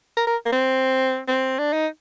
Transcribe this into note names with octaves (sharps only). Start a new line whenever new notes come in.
A#4
A#4
A#3
C4
C4
D4
D#4